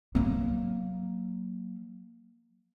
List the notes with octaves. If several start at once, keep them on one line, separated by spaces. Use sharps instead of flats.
F#3 A#3